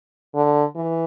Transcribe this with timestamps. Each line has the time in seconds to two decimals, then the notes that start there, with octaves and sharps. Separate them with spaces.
0.35 D3
0.76 E3